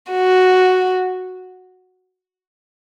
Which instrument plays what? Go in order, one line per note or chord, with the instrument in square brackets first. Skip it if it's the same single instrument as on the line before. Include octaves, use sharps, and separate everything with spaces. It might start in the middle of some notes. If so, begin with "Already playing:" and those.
[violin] F#4